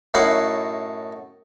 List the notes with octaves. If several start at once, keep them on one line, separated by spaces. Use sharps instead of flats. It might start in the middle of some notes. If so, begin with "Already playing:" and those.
F#2 A2 D#4 E4 F5 F#5